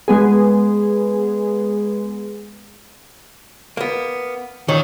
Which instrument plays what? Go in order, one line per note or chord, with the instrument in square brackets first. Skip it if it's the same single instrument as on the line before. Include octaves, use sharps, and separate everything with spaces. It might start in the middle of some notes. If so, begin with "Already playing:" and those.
[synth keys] G#3 B3 G#4
[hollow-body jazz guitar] A#3 B3
[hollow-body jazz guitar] A#2 C#5 [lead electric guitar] D#3